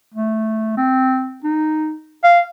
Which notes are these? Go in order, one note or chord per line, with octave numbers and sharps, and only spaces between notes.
A3
C4
D#4
F5